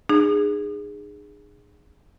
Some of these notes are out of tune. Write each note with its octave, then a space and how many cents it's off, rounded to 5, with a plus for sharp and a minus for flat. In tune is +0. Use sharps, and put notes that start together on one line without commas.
D#4 -45 G#4 -10